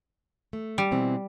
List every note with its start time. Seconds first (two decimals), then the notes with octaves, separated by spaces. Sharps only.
0.53 A3
0.78 G3
0.91 B2 E3 C4